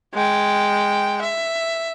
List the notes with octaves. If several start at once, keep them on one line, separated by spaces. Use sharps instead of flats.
G#3 G5
E5